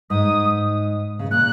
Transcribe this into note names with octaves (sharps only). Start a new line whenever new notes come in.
G#2 D#6
C#3
A#2 F#6